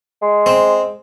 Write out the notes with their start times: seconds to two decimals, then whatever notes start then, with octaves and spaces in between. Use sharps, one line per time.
0.22 G#3
0.46 C4